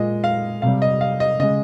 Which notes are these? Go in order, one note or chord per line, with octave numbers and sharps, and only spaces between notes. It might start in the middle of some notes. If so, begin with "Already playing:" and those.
Already playing: A#2 G#3 D#5
F5
C3 G3 F5
D#5
F5
D#5
C#3 G#3 D#5